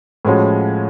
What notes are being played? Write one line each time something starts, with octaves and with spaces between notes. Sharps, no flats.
A2 F3 G#3 C#4 F#4